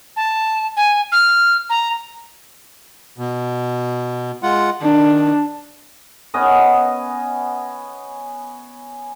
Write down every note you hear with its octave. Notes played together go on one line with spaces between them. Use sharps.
A5
G#5
F6
A#5
B2
G#3 F4 F#5
D#3 D4
B3 C#4 D#5